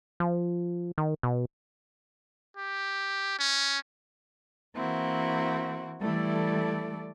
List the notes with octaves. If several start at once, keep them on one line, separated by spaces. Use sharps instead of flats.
F3
D#3
B2
G4
C#4
E3 A#3 C4 E4 F#4
E3 G3 A3 E4 A4 D5